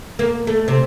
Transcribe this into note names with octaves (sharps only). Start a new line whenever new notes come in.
A#3
A3
C3